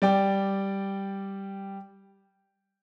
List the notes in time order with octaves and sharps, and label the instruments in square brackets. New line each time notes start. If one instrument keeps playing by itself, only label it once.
[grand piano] G3 D5 G5